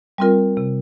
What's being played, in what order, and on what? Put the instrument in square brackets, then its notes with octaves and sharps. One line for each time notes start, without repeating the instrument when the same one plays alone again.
[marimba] G3 C4 F4 A#4
C3